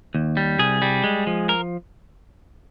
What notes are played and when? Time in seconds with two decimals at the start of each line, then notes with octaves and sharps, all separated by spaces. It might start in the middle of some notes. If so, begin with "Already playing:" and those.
0.15 D#2
0.37 G3
0.59 C2 G#4
0.82 G3
1.04 G#3
1.27 F3
1.49 A#4